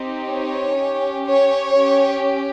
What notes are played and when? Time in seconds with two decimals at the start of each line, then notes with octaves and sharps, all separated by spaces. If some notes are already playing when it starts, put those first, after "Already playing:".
Already playing: C4 D#4 G4
0.27 C#5
0.77 C#4 G4
1.26 C#5
1.75 C#4 G4